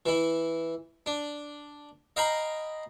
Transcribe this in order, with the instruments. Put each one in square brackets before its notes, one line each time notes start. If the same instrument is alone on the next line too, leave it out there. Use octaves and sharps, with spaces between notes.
[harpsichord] E3 E4
D4
D#5 F5 G5 G#5 A#5 B5